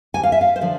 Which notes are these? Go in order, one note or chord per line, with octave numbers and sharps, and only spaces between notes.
D2 G#5
F5
E5
F5
C5
D3 F3 D5